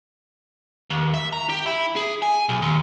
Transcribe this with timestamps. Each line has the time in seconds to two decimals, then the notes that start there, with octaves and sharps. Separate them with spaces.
0.91 D#2
1.14 E5
1.33 A#5
1.49 G4
1.66 E4
1.96 G#4
2.22 G#5
2.49 B1
2.62 D#2